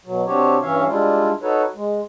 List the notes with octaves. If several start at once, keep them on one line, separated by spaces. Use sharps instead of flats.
B2 F#3
C3 C4 D4 F#4 G4 C#5
G2 E3 C#4 C#5 E5 F5
G3 G#3 D4 E4 F4
D#4 F#4 A4 B4 C#5
G#3